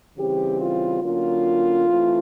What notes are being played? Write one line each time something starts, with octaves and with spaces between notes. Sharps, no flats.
C#3 E3 G3 C4 G4
F4
D3 F#3 A#3 C#4 F4
E3 A3 C4